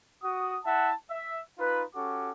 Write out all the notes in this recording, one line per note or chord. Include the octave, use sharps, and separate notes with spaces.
F#4 D#6
E4 E5 F#5 A5
E5
D#4 F4 B4
C#4 F#4 G4 A4 D6